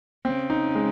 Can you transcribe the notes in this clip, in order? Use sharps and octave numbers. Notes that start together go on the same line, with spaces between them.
C#3 C4
D#4
G#3